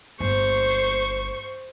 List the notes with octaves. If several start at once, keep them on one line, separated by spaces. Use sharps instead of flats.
G1 C5 C#6